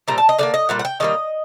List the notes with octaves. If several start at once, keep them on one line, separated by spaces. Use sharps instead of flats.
A#2 G3 C4 A#5
A5
D#5
D3 G3 A#3 D5
D#5
A#2 G3 F#5
F#5
G5
D#3 G3 A#3 D#5